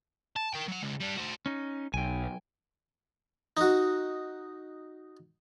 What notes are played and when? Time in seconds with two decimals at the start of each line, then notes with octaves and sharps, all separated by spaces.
0.36 A5
0.54 A#4 G5
0.68 F#3 F#5
0.83 C#2 C#3
1.00 G3 D4
1.17 F#4 C5
1.46 C#4 D#4
1.94 B1 G5 G#5
3.57 D#4 F#4